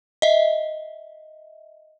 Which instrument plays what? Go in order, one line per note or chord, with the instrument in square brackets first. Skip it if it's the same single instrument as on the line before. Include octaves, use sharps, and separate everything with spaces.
[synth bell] D#5 E5